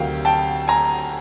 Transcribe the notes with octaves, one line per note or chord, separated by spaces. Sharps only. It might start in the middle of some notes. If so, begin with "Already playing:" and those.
Already playing: D2 C3 D#3 F#3 F5 G5
G5 A5
G#5 A#5